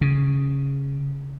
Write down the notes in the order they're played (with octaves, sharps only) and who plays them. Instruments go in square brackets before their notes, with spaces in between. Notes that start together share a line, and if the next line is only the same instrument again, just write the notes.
[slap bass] C#3